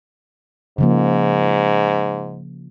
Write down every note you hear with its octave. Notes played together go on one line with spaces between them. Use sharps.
G#2 C#3 F3 A#3